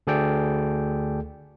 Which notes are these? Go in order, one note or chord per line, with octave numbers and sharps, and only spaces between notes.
D2 G#4 A4 D5 G5